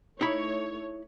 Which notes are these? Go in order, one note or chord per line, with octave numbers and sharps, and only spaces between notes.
A3 D#4 E4 C#5 B5